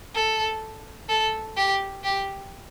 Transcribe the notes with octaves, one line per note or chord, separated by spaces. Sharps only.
A4
A4
G4
G4